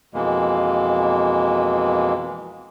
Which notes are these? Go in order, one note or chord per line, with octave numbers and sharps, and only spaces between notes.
F2 B2 E3 G#3 A#3